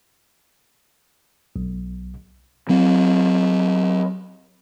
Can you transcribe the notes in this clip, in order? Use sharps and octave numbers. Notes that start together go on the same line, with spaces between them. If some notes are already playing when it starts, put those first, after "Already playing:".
B1
F#3 C4